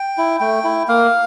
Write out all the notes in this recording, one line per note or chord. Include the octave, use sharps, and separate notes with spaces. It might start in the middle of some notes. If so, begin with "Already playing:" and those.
Already playing: G5
E4
A3 G5
E4
A#3 F5